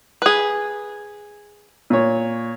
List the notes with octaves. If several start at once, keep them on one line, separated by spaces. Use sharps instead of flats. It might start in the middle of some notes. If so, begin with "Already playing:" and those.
G#4 B4
A#2 C#5